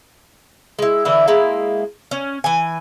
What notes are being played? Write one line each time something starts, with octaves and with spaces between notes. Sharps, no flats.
G#3 E4
D3 E3 E4 E5
G#3 A#3 E4
C#4
E3 G#5